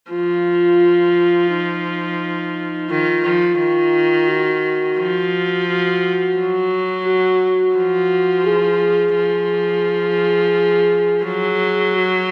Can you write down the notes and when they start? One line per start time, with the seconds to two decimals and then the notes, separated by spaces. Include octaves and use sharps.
0.10 F3 F4
1.50 D#4
2.90 D#3 F4
3.24 F3
3.59 D#3
4.29 F#4
4.98 F3
5.68 F#4
6.37 F#3
7.07 F#4
7.77 F3
8.46 G#4
9.15 F3
11.24 F#3 G#4
11.95 F#4